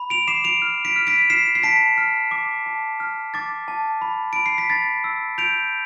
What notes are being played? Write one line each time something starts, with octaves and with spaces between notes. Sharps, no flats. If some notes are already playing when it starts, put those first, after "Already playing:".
Already playing: B5
D7 F7
D6 C7 E7
D7 F7
F6
B6 D7
F6
B6 D7
F6 C7 E7
C7
A5 B6 D7
F6
D6
A5
F6
D6 A6
A5
B5
B5 D7
C7
B6
B5 A6
E6
G6 D7 F7